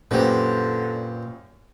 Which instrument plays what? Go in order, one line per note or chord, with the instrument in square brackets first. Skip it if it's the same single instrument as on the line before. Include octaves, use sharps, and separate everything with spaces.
[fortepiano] F#2 G4 [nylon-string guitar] A#2 [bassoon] D3 [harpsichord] B4 C5